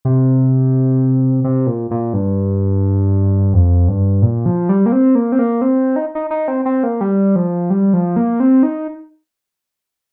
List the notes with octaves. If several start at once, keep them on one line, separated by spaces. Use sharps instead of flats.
C3
C3
A#2
A#2
G2
F2
G2
A#2
F3
G3
A#3
C4
A#3
C4
A#3
C4
D#4
D#4
D#4
C4
C4
A#3
G3
F3
G3
F3
A#3
C4
D#4